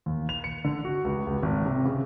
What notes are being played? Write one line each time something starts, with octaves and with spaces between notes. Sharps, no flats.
D#2
F7
C#7
D3
F#4
C#2
C#2
G#1
C3
C#3